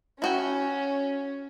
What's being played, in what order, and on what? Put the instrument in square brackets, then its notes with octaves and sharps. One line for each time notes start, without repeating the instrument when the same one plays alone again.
[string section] C#4 [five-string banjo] E4 F#4 G5